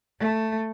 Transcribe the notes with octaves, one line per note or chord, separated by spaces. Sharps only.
A3